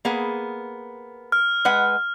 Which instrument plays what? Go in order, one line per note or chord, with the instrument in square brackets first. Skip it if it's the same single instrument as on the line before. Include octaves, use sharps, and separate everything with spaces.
[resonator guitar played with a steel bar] A#3 B3 G#4
[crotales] F6
[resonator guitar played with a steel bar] G#3 B4 F#5